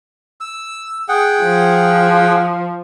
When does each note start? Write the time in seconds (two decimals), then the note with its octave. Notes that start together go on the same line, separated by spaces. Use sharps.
0.41 E6
1.09 G#4 F#5 G5
1.44 F3